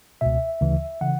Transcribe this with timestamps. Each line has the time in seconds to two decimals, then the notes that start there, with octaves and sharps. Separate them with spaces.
0.21 C#2 B2 E5
0.61 D2 C#3 E3
1.01 C#3 E3 F#5